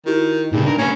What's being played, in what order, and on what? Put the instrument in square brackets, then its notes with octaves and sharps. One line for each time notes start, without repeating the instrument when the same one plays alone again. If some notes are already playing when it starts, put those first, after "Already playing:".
[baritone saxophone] D#3 [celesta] E4 F#4 G4
[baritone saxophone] G2 [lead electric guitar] A#2 C#3 [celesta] D#4 G#4 B4
[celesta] D4 [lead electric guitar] A#4
[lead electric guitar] A#3 B4 [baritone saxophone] C#4